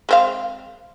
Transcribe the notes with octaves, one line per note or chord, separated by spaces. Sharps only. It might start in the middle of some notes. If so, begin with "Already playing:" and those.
G#3 C4 F5